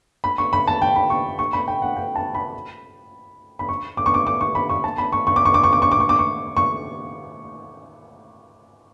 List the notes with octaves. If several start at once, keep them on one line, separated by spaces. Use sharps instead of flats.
B5
C#6
B5
A5
G5
B5
C#6
C#6
B5
G5
F#5
G5
A5
B5
B5
C#6
D6
C#6
D6
D6
C#6
B5
C#6
A5
B5
C#6
C#6
D6
C#6
D6
C#6
D6
C#6
D6
C#6
D6
C#6
C#6